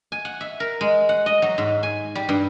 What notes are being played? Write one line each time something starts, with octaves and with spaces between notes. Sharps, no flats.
G#5
F#5
E5
A#4
G#3
F#5
D#5
F#3
G#2
G#5
G3
G2